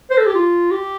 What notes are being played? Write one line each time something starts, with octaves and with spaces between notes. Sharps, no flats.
C5
A4
G4
F4
G4